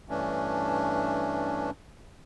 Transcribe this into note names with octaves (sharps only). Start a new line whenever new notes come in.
G2 E3 A3 C#4 D4